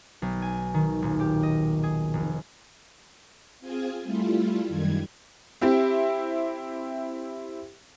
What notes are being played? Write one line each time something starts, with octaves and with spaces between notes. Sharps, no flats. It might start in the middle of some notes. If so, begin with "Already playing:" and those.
B1
G#5
D#3
D#1
G4
D#5
G#4
F1
C4 F4 G#4 G#5
G3 A3 E4 F4
F#2 D#3 G3 G#6
C4 E4 G4 E5